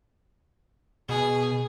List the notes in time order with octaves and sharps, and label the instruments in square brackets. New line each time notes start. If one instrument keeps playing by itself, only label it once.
[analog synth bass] B2 [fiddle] G#4